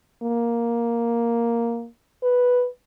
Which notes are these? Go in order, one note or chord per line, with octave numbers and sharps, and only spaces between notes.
A#3
B4